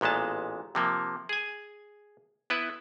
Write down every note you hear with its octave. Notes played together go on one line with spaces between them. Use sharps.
A1 A#2 G#3 B3 A5
C3 F3 A#3
G#4 G#5
B3 E4 B4